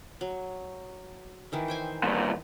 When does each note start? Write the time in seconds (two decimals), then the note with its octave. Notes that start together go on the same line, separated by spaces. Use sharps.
0.21 F#3
1.52 D#3 E3 D#4
1.68 C5 G5 G#5
2.03 G2 A#2